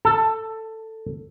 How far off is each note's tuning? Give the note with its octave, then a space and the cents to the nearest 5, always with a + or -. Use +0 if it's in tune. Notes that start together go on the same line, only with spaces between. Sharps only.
A4 +10 A5 +40